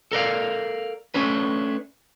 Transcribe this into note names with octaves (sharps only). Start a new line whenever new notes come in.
A4 A#4 D5 F5
A3 C#4 D4 B4